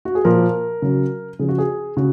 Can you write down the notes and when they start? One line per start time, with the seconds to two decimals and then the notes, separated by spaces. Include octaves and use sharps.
0.05 F#4
0.15 G#4
0.25 A#2 F3 A#4
0.82 C#3 F#3
1.39 C#3 F3 G#4
1.49 F#4
1.58 G#4
1.97 C#3 F#4